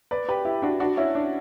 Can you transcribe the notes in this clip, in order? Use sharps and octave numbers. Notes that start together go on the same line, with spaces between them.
B4 D5
G4 B4
E4 G4
D4 F#4
D4 F#4
C#4 E4
D4